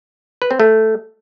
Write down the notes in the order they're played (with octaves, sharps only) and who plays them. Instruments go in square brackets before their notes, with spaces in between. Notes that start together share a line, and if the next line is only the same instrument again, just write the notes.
[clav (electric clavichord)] B4
C4
A3